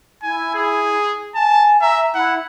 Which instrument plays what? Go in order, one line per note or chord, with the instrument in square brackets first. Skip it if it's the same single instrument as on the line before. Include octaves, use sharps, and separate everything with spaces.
[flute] E4 [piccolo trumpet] G#5
[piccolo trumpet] G#4
[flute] G#5 [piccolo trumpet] A5
[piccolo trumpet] E5 [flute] A#5
[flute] E4 [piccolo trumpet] F#5